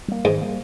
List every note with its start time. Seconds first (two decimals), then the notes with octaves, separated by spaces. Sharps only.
0.08 G3 A#3
0.24 G#2 D#3
0.41 G3 A#3